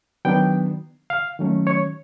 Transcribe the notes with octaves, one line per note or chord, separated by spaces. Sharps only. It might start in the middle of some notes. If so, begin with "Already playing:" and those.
D#3 F#3 B3 D4 G5
F5
D#3 F#3 A3 C#4
C#5